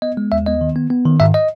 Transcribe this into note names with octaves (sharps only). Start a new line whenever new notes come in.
B3 D#5
G#3
D#2 E5
B3 D#5
D#3
B3
B3
D#3
G#2 E5
D#5